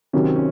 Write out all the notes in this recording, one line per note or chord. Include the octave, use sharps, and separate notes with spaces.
C3 D#3 F#3 C#4
C4
C#4